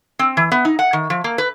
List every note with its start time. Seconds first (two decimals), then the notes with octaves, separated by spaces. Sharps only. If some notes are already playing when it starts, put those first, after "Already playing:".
0.19 C4
0.37 E3
0.52 B3
0.65 D#4
0.79 F#5
0.93 D#3
1.10 F3
1.24 A#3
1.38 B4